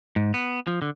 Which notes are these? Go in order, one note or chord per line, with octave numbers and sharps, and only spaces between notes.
G#2
B3
F3
D3